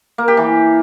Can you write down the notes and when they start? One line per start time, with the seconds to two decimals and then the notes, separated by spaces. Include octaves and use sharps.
0.18 A#3
0.28 G4
0.37 E3